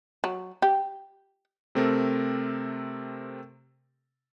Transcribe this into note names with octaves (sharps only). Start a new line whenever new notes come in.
F#3
G4
C3 A3 C4 A4 A#4